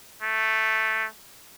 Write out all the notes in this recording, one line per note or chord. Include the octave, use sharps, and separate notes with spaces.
A3